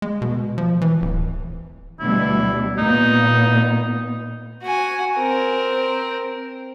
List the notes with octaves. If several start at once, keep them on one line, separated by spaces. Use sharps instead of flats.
G#3
B2
F3
E3
D1
D2 B2 G3 E4
A#2 B3 D#4
F#4 G#5
C4 A#4